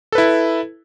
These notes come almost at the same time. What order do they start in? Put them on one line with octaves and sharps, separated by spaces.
A4 B4 E4